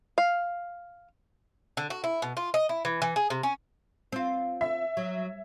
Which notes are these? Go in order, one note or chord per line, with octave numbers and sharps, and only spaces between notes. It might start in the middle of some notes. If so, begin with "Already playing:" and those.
F5
D3
F#4
E4
B2
F4
D#5
E4
E3
E3
G#4
C3
C#4
C4 F4
E5
F#3